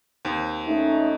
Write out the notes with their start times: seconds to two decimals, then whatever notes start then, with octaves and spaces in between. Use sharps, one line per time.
0.25 D#2 C4
0.65 A3 C#4 D#4